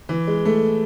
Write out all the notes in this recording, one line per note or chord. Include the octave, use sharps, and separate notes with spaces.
E3
G#3
A3